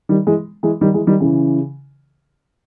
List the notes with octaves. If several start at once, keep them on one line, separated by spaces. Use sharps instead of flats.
D#3 G3
E3 G#3
E3 G#3
D#3 G3
E3 G#3
D#3 G3
C#3 E3